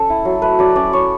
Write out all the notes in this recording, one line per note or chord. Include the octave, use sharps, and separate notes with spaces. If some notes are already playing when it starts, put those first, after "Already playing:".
Already playing: C#4 A4
E4
F#3
A3 B4
F#3 D5
C#4 D5
E4 C#5